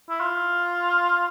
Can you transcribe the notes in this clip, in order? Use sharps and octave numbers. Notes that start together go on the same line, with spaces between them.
E4
F4